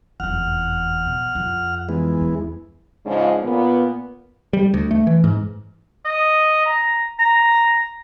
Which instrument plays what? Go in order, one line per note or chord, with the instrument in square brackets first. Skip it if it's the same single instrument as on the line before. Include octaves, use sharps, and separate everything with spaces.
[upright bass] F1 E2 [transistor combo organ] F#5 F6
[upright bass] B2
F2
[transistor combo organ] E3 G#3 B3
[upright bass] E2
[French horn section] G#2 C#3 F3 G#3 D4
A#2 B3
[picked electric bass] G3
D2
A3
E3
G#2
[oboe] D#5
A#5
A#5